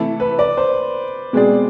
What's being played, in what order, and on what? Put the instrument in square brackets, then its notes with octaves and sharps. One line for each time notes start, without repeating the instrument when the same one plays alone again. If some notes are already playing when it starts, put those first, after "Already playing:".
Already playing: [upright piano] C3 E3 A3 E4 A4
[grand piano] B4
D5
C5
[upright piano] B2 G#3 C4 G#4 D5